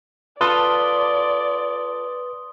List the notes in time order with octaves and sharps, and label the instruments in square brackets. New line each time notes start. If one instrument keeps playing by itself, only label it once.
[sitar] F4 A4 [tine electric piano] B4 [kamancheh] D5 [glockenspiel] C6 D#6 G7